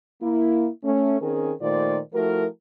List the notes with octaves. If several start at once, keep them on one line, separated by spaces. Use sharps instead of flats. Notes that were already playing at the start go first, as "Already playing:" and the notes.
A#3 E4
A3 C#4
D#3 C4 C#4 G#4 A#4
A#2 D#3 A3 F4 C5 D5
F3 A3 E4 F#4 A#4